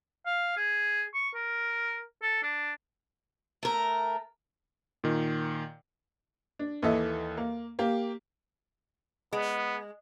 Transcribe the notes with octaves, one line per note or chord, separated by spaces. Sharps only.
F5
G#4
C#6
A#4
A4
D4
A3 A#4
A#2 D#3
D4
D#2 E3 A4 D#5 E5
A#3
A#3 G4
G#3 B3